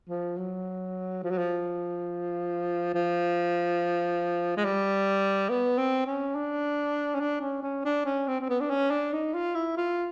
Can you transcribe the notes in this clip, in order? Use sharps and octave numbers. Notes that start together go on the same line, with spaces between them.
F3
F#3
F3
F#3
F3
F3
G#3
G3
B3
C4
C#4
D4
C#4
D4
C#4
C#4
D4
C#4
C4
C4
B3
D4
C#4
D4
D#4
F4
E4
F4